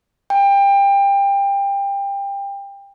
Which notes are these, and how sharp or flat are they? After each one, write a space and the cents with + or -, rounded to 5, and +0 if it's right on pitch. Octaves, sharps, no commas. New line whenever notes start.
G5 +25